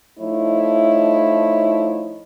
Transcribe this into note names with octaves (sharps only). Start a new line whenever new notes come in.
F3 A3 D#4 E4 C#5 D#5